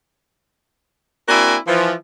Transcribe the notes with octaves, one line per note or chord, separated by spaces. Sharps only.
A#3 C4 D4 E4 F#4 G#5
E3 F3